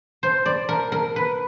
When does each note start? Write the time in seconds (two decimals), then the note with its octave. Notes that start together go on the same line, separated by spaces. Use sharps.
0.23 C5
0.46 D5
0.69 A#4
0.92 A#4
1.16 B4